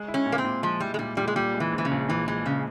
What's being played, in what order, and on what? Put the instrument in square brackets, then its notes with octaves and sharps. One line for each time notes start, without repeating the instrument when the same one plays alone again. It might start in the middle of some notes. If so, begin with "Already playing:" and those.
Already playing: [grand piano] G#3
E4
[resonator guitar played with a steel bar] C#4
[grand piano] A#2
[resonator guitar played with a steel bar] A#3
C4
[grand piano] A#2
[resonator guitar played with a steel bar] F3 [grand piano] G#3
[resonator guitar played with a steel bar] G3 [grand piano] E4
[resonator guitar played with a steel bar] G#3
[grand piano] A#2 [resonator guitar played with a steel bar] G3
[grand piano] A#2 [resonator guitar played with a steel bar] G3
[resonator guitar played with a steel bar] G#3
[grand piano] A#2 [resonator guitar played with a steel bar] G3
[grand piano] G#3
[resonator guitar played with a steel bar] E3
[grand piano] A#1
[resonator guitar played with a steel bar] E3
C#3
[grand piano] A#1
[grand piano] A#2 [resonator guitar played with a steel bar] E3
[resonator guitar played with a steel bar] E3 [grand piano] G#3
[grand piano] A#1 [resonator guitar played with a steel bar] C#3